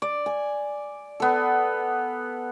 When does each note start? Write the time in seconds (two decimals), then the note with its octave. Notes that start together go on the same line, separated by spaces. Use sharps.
0.02 D5
0.26 G#5
1.20 B3 A4